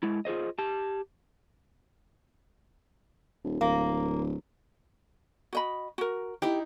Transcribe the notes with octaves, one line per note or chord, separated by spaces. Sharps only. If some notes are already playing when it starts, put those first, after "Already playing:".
G#3 E4
F4 G#4 C5 D#5
G4 A5
D#1
D1 A#3
F#4 D#5 B5
F#4 A#4
D#4 E4 G4